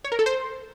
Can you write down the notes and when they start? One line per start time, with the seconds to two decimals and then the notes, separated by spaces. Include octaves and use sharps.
0.04 C#5
0.12 A#4
0.19 A4
0.26 C5